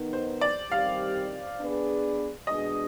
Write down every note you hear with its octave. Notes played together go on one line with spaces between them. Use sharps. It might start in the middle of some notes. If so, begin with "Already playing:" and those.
Already playing: D#3 B3 D#4
C5
D5
D#3 G3 C4 G4 F5
B3 D4 G#4 B4
B2 G#3 D4 G#4 D#5